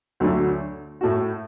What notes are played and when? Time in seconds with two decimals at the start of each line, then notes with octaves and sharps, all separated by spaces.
0.20 D2 D3 F#3 A3 D4
1.01 A2 A3 F#4